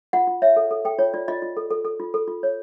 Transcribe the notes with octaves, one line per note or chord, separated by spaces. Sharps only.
F4 F#5
F4
C#5 E5
A4
A4
A4 G5
F4 C#5
F4 D5
F4 D#5
F4
A4
A4
A4
F4
A4
F4
C#5